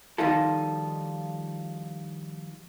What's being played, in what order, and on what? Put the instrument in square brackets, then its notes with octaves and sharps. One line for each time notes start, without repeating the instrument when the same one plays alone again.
[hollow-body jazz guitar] D#3 F3 G3 D#4 F4 A4